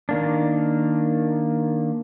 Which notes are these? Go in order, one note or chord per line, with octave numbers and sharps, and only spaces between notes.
D#3 A#3 D4